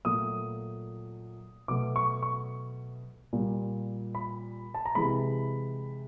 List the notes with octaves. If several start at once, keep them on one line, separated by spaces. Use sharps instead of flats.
A#2 F#3 A3 D#6
B2 F#3 A3 D6
C#6
C#6
A#2 G3
B5
A5
A#5
C3 E3 G#3 B5